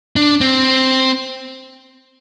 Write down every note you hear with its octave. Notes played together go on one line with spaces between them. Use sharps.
D4
C4